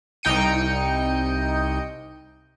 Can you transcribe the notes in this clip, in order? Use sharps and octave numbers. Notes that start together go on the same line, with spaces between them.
C2 D#4 G5 C#7 D#7